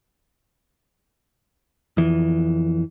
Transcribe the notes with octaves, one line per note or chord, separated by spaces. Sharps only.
F2 E3